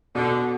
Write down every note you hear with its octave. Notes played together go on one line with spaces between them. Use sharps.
B2 D3